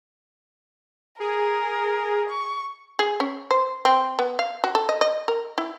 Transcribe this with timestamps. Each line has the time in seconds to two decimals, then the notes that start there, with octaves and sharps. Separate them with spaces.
1.20 G#4 A#4
2.29 C#6
2.99 G#4
3.20 C#4
3.51 C5
3.85 C4
4.19 B3
4.39 F5
4.64 F#4
4.75 A4
4.89 D#5
5.01 D#5
5.28 A#4
5.58 E4